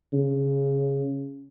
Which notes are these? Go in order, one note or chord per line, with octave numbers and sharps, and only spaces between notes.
C#3